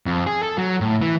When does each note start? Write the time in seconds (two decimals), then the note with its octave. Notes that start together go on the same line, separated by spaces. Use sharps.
0.06 F2
0.26 G#4
0.43 A4
0.58 F#3
0.81 A2
1.02 E3